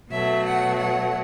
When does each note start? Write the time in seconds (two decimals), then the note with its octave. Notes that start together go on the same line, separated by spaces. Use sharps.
0.10 B2 F#3 A3 E5
0.44 F#5
0.78 F#5